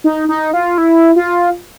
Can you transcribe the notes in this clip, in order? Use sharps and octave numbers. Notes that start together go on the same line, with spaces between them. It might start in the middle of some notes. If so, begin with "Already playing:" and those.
D#4
D#4
F4
E4
F4